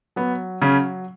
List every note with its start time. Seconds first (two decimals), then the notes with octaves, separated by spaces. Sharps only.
0.16 F#3 B3
0.62 C#3 F#3 C#4